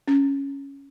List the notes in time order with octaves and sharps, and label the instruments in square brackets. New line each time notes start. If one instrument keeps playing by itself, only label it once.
[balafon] C#4